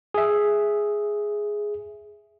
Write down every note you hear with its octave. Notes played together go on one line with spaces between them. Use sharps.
G#4 E5